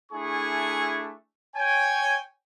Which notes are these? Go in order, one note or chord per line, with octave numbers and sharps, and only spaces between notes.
A3 D4 E4 G#4 G#5 C#6
C#5 G5 G#5